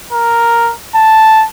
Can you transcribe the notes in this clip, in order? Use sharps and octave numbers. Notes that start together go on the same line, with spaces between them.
A#4
A5